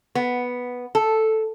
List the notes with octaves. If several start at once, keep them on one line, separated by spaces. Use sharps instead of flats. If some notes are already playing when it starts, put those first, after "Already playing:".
B3
A4